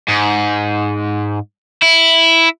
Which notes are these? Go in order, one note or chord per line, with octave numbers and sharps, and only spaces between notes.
G#2
E4